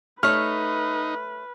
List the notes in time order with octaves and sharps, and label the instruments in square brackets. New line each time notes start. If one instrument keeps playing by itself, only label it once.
[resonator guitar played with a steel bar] A3 C#5 [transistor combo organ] D#4 [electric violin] B4 [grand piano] F6